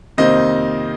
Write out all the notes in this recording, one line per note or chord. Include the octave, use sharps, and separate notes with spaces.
F2 C3 D#3 A#3 C5 D#5